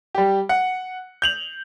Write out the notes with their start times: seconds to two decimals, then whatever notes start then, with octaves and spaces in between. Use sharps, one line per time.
0.15 G3 G4
0.49 F#5
1.22 G6 F7 F#7